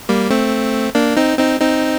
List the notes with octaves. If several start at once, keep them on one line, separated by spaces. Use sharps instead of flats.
G3 A#3
A3 C4
A#3 D4
C4 D#4
C4 D#4
C4 D#4